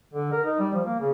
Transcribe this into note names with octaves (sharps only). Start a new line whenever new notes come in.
D3
A#4
D#4
G3
F3
A#3
C#3